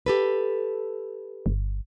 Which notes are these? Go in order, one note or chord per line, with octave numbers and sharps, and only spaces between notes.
G4 A4 B4
G1